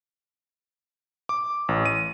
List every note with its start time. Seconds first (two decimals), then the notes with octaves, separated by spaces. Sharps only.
1.29 D6
1.69 A1
1.86 D#7